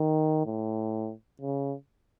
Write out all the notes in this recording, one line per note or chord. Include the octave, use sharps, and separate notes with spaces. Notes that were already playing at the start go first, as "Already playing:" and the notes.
Already playing: D#3
A2
C#3